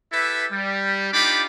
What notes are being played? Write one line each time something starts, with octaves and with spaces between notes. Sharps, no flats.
E4 G4 A4 B4 E5
G3
D4 D#4 F4 G4 B5 D6